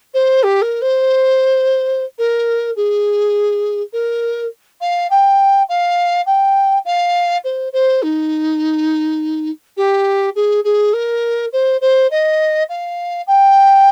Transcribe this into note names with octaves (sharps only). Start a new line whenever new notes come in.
C5
G4
A#4
C5
A#4
G#4
A#4
F5
G5
F5
G5
F5
C5
C5
D#4
G4
G#4
G#4
A#4
C5
C5
D#5
F5
G5